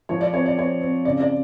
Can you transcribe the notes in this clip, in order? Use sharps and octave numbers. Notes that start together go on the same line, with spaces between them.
F3 C#5
D5
C4 C#5
D5
C4 C#5
C4
C#3 D5
D5